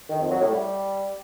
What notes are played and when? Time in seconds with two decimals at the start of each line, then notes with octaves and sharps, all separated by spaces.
0.10 D#3
0.20 F2
0.30 F#3
0.41 A2
0.51 G3